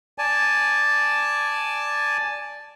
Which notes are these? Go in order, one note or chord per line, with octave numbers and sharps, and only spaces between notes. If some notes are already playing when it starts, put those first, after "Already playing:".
D5 G#5 A5